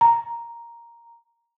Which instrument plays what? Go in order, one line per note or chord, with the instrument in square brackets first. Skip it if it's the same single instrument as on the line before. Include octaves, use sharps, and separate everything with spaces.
[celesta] A#5